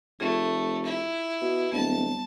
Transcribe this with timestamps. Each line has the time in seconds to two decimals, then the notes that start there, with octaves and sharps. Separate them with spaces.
0.20 F1 A3 F4 G#4
0.85 E4
1.41 B2
1.72 D1 G3 B3 A5